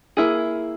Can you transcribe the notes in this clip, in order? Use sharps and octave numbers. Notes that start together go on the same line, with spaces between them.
A#3 E4 G#4